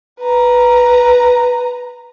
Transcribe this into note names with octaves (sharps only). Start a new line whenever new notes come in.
B4 A#5